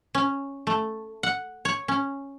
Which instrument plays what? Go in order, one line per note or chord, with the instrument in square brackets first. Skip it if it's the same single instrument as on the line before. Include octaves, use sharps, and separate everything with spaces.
[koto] C#4
A3
F#5
C#5
C#4